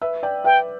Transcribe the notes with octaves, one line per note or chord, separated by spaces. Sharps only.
B4 E5
D5 G5
B4 E5 G5